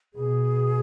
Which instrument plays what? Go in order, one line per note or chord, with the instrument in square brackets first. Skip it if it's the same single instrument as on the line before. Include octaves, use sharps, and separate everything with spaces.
[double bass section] B2 [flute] G#4